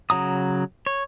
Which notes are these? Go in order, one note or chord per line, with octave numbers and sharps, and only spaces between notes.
C#3 F#3 A#5 D#6
C#5